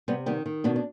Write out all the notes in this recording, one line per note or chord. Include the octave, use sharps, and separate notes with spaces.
C3 G3 B3
D#3 G3 B3
D#3
B2 B3 D4
D4